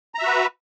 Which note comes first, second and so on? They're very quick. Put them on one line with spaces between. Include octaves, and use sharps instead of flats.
A#5 E5 F#4 B4